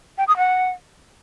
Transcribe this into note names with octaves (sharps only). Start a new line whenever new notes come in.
G5
D#6
F#5